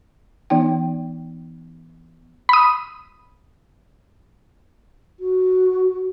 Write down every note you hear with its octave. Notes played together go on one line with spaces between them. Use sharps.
E3 B3 D#4 G5
B5 D#6
F#4